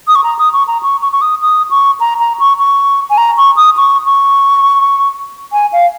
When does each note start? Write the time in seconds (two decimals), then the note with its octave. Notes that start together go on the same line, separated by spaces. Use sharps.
0.08 D#6
0.15 C#6
0.24 A#5
0.39 D#6
0.53 C#6
0.67 A#5
0.83 C#6
1.02 C#6
1.12 C#6
1.22 D#6
1.42 D#6
1.71 C#6
2.00 A#5
2.20 A#5
2.39 C#6
2.59 C#6
3.10 G#5
3.18 A#5
3.37 C#6
3.56 D#6
3.77 C#6
4.06 C#6
5.53 G#5
5.73 F5